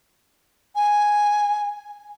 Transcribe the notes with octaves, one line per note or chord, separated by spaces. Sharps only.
G#5